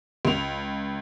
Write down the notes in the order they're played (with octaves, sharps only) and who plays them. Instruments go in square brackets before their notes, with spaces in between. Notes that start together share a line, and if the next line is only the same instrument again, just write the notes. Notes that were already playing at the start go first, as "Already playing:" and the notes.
[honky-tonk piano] C#2 F7